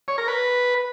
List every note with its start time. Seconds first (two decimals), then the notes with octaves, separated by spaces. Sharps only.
0.08 C#5
0.18 A#4
0.28 B4